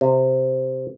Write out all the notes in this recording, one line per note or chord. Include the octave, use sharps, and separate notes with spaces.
C3